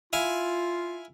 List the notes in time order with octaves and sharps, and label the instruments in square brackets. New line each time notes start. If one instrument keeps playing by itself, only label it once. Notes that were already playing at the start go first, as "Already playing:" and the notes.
[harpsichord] E4 F5 G#5 [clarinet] F4